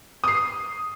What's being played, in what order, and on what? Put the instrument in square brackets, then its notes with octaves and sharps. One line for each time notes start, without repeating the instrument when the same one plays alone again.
[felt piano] D#6 C7